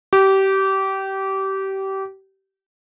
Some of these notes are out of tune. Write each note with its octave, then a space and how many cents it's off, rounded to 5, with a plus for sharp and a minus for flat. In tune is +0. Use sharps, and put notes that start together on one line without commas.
G4 -25